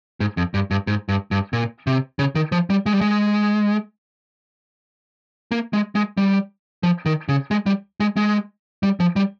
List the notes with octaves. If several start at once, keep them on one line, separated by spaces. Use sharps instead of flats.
G#2
F2
G2
G2
G#2
G2
G2
A#2
C3
C#3
D#3
F3
G3
G#3
G3
G#3
A#3
G#3
G#3
G3
F3
D#3
C#3
G#3
G3
G#3
G#3
G3
F3
G3